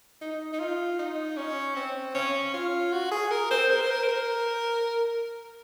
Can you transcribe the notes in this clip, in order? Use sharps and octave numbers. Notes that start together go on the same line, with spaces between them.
D#4
D#4
F4
D#4
C#4
C4
C#4
F4
F#4
G#4
A#4
C5
A#4
C5
A#4
C5
A#4